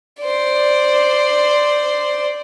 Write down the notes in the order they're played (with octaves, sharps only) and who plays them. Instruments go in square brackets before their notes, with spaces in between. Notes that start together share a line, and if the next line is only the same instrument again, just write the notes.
[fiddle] C5 D5